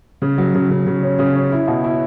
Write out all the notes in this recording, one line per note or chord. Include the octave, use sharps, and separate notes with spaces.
C#3
F#3
C#3
C#3
C#3
C#4
C#3
C#4
E4
B2
E4